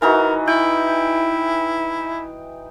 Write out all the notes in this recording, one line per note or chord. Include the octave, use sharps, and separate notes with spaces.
E3 D#4 F#4 A#4
E4 G5